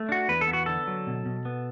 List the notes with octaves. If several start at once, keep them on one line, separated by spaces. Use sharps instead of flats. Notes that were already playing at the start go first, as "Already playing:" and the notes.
Already playing: A3
D4 F#4
E2 B4
A4
B3
F#4
D3 A4
F#3
B2
B2
B3